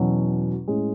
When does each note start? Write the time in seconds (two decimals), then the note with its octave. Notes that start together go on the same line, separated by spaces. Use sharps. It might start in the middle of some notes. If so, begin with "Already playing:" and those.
Already playing: E2 B2 F#3 C#4
0.68 A2 G#3 C#4